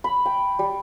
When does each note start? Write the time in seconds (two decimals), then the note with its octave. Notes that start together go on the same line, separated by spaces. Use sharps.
0.04 B5
0.26 G5
0.59 G3